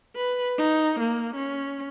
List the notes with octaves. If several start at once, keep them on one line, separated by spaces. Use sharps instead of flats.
B4
D#4
A#3
C#4